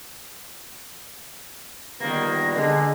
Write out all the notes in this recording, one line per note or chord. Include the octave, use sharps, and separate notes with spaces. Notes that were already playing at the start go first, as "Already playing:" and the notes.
A#1 D#3 G3 A#3 B3 A#6
D3 G#3